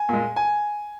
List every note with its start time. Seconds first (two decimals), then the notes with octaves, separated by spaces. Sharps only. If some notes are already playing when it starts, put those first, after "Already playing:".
Already playing: G#5
0.09 A#2 G#3
0.36 G#5